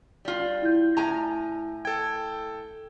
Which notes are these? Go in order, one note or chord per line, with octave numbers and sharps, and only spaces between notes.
G3 F4
E4 G6
A2 G#5 A#5
A4 G5 G#6